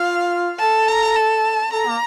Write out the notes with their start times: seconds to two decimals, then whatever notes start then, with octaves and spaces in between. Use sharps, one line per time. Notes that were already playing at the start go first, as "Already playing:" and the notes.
Already playing: F4 F5
0.59 A4 A5
0.88 A#5
1.16 A5
1.72 A4 A#5
1.87 A#3